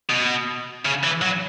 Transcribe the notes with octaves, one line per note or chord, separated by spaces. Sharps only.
B2
C#3
E3
F#3